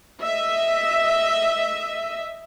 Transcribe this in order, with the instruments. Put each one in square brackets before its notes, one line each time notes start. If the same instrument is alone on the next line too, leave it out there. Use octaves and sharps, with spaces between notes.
[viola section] D#5 E5